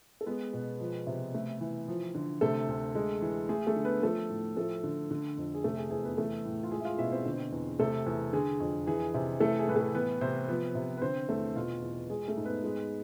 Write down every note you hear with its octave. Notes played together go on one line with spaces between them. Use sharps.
A4
G#3 B3 B4
B2
F3
C3
A3
E3
F3
D3
C3 A3 A4
D2
G#3
E3
A3 G#4
A3 A4
D3
B3 B4
F3 A3 A4
A2
F3 A3 A4
D3
D3
F2
G#4
C3 A3 A4
G#4
E2 G#4
B3 B4
E3 A3 A4
A2
F4
G#3 G#4
E5
F4 F5
B2 E4 E5
C4 C5
D3
E2
C3 A3 A4
E2
D3 G#4
F2
E3 G#4
C3
E3 A3 A4
G#4
A2 B4
A3 A4
E3 B3 B4
C3 C4 C5
F3 B3 B4
C3
B4
D3 C4 C5
E2 A3 A4
B2 F4
E2
G#3 G#4
A3 A4
G#2
B3 B4
G#3